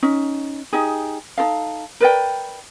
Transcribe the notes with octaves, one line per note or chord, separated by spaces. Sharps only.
C#4 D#4
D#4 G4 G#4
D#4 F#4 A4 F5
A#4 B4 D5 G5